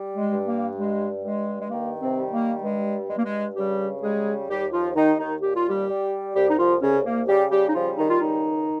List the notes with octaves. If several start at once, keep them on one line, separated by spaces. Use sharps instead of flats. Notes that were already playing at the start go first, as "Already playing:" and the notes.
Already playing: G3
G#3
G2
A#3
G3 G#3
G2 G#3
G#3
D#3 A#3
C3 C4
G3
A#3
G2 G#3
G2 G#3
A#3
G#3
C#3 G3 G4
G3 G#3 G#4
D#2 G3 G4
F3 F4
D#2 D#3 D#4
D#3 D#4
A#2 G4
F4
G3 G4
G3
C2 G3 G4
D#4
F3 F4
C2 C#3 C#4
A#3
C#3 G3 G4
G3 G4
D#4
F3 G3 F4
D#3 D#4
F4
C#2 D#3 D#4